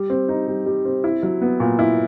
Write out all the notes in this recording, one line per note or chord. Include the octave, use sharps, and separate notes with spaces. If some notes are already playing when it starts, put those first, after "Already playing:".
Already playing: G3
C4
D#4
G3
G3
C4
E4
F#3
B3
A#2
E4